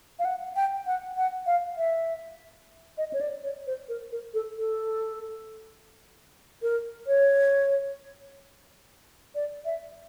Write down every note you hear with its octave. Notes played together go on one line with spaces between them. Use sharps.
F5
F#5
G5
F#5
F#5
F5
E5
D#5
C#5
D5
C#5
C5
A#4
A#4
A4
A4
A#4
C#5
D5
E5